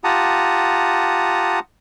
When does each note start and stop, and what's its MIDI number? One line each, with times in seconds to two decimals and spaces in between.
0.04 1.59 65
0.04 1.59 67
0.04 1.59 78
0.04 1.59 81
0.04 1.59 82
0.04 1.59 87